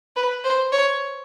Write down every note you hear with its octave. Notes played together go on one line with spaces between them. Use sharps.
B4
C5
C#5